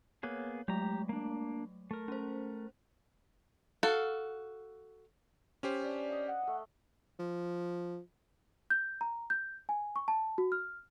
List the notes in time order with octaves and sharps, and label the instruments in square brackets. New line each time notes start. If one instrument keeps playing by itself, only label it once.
[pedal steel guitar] A#3 B3 G#4 [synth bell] C#5
[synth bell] F#3 G#3 A3 [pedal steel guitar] G4 A#5
[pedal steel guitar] A#3 D4
A3 A#4
[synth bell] C#4 C5
[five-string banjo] F#4 A4 F5
[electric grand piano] C#4 G4 C5
[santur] D4 D5 G#5
D#5 F5
[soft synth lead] F#5
[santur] A3 D#6
[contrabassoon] F3
[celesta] G6
A#5
G6
G#5
C#6
A5
F#4
F6